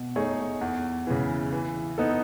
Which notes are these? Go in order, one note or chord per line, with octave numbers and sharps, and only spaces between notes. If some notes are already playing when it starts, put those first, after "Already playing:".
Already playing: B2
A3 D#4 G#4 C#5
E2
C#3 E3
E3
B3 D#4 A4